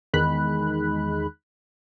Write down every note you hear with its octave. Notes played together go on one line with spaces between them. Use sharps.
E2 D#3 G#3 B5 F#6